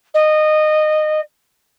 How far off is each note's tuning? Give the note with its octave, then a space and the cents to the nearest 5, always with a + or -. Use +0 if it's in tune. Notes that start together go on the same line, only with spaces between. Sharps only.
D#5 -20